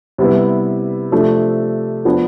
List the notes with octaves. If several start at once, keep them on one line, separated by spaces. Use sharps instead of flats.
C3 G3 B3 E4 B4
C3 F3 A3 D4
F3 B3 D4